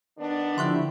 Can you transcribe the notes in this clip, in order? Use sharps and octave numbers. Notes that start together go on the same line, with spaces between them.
D#3 B3 D4
D3 F3 E4 G4 C6 C#6 F#6